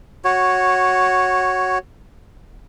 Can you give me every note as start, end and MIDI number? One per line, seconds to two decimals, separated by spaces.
0.25 1.78 66
0.25 1.78 73